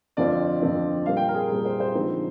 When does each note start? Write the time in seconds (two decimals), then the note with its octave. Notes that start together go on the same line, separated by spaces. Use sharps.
0.17 F2 D3 F3 C4 F4 D5
0.61 F2 D3 F3 C4 F4
1.06 A#2 G3 C4 F5
1.17 G5
1.28 A#4
1.34 G#4
1.39 A#4
1.50 A#2 G3 C4 G#4
1.65 C5
1.80 C5
1.95 D3 F3 G#3 C4 D#4